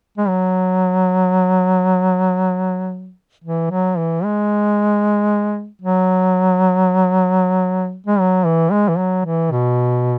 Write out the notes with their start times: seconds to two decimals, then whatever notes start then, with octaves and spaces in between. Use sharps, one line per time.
0.18 G#3
0.28 F#3
3.44 E3
3.70 F#3
3.97 E3
4.24 G#3
5.82 F#3
8.07 G#3
8.19 F#3
8.46 E3
8.71 G#3
8.89 E3
8.98 F#3
9.25 E3
9.51 B2